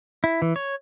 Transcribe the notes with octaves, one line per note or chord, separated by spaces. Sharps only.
E4
E3
C#5